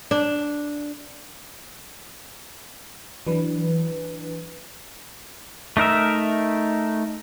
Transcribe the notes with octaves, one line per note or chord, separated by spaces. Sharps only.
D4
E3 F#3 D4 B4
A3 D#4 A#4 E5